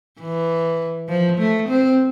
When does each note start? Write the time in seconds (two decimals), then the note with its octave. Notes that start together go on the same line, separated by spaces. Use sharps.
0.21 E3
1.09 F3
1.39 A3
1.69 C4